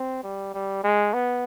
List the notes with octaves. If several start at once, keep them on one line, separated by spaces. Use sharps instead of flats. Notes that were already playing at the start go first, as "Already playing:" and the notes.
Already playing: C4
G3
G3
G#3
B3